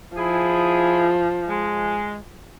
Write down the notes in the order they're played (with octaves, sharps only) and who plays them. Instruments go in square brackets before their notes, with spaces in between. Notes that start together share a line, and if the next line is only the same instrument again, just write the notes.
[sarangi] F3 [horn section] E4 G#4
[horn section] G#3